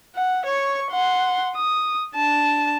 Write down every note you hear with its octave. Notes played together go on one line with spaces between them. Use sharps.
F#5
C#5 C#6
F#5 C6
D#6
D4 A5